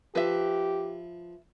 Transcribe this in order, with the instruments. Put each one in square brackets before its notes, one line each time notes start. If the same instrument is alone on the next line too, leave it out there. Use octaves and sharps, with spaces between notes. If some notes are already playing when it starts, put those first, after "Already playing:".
[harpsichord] F3 [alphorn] G4 [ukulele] B4 E5